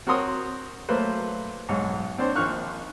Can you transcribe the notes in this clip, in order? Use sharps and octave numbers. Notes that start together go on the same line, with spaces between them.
C4 F#4 A#4 C#5 C6 D#6
F#3 A3 A#3 B4 C5
B1 G#2 C#5
C4 D4 C5 C#5
A#1 D#3 C#6 F6 F#6